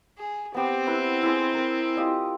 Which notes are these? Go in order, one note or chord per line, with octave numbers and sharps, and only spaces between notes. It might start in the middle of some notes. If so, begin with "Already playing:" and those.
G#4
B3 C4 G4
E4 B4
E4 G#4 C6
A#4
F4 G4 D#5